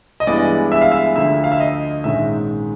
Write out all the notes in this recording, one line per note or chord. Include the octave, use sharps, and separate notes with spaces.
D#5
G2 E3 G#3 B3 D5
E5
F5
E5
D2 D3 F3 E5
F5
E5
D#5
A#1 G#2 D#3 G#3 C#4 E5